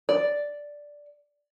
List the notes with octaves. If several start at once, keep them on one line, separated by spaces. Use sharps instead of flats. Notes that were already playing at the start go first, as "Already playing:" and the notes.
D5